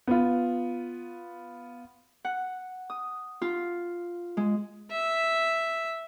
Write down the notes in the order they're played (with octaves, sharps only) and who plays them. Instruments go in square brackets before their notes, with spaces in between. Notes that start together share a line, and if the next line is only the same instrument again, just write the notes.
[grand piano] B3 F4
[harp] F#5
D#6
F4
G#3
[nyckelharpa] E5